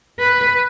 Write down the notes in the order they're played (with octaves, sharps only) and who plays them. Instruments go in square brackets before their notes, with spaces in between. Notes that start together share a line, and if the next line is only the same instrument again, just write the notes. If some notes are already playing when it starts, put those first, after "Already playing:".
[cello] B4